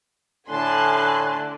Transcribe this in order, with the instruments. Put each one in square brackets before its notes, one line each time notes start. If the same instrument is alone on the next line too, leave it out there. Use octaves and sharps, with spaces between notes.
[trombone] A2 [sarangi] D3 [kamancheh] G#5 F#6 [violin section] A5 C6